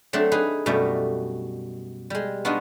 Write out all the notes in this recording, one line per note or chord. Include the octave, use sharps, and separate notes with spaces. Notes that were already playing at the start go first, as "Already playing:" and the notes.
F#3 A3 C4 D4 A4
D#4 G#4 B4
F#2 B2 G3 A3 D5
G3 G#3
B3 D4 D#4 F4 F#4